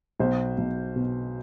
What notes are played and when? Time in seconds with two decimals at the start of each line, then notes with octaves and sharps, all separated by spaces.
0.20 B1 C5
0.58 B1
0.96 B2